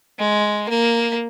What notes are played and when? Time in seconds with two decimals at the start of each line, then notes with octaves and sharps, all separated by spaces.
0.19 G#3
0.69 A#3